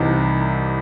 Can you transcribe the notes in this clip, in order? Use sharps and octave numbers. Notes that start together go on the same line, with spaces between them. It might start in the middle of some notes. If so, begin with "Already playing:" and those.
Already playing: C2 C3 E3 D#4